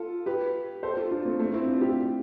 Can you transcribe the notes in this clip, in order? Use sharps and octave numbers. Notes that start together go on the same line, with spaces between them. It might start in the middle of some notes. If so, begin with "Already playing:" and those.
Already playing: F4 A4
G4 B4
A4 C5
F4 A4
D4 F4
A3 C4
A3 C4
C4 E4
D4 F4
E4 G4